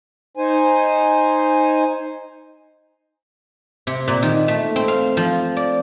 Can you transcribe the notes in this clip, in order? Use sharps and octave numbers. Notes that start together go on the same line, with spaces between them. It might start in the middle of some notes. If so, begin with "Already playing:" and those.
D#4 C5 G#5
C3
A#2
D#3
A3
C4
F5
F3
D5